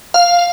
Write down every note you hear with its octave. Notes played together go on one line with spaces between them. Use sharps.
F5